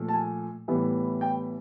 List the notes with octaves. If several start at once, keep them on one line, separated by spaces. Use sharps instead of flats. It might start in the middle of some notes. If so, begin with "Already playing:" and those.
Already playing: A#2 F3 A3
A5
G#5
A2 E3 G3 B3
G5